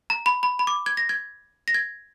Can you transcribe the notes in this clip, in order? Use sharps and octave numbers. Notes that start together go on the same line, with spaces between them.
A#5
B5
B5
B5
D6
G#6
A#6
G#6
A#6
G#6